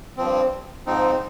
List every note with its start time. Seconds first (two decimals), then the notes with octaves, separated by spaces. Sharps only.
0.17 G2 F3 C4
0.86 G#2 F3 C4 D#4